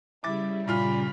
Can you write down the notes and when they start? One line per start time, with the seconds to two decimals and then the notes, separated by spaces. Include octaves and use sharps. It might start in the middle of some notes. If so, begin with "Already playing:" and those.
0.24 C#3 G3 E4 D6 A6
0.68 G2 A#2 F4 B5 F6